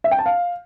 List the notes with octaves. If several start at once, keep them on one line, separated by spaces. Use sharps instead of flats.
E5
G5
A5
F5